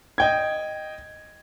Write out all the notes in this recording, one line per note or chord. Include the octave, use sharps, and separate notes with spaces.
D#5 G5 G#6